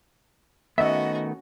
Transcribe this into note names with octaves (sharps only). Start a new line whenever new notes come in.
D#3 A3 B3 C#4 F#4 D#5 E5